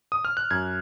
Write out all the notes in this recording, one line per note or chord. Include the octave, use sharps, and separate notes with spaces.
D#6
F6
F#6
F#2 G#6